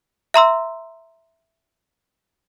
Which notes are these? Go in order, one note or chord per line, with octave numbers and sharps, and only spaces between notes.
E5 A#5 C6 E6